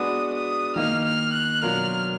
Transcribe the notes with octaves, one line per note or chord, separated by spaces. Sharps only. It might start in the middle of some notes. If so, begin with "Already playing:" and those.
Already playing: G#3 B3 D4 F#4 D#6
D#6
D#3 A#3 D#4 F6
F6
F#6
B2 F#3 D4 F4 A#4 F6